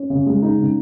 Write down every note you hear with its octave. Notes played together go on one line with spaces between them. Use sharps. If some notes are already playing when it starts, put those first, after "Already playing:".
Already playing: C#4
C#3
G#3
D#4
C#3